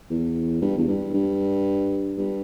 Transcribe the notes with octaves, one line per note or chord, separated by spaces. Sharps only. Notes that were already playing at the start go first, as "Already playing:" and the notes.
E2
G2
E2
G2
G2
G2